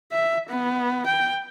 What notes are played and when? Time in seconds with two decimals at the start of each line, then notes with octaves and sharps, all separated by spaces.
0.12 E5
0.49 B3
1.07 G5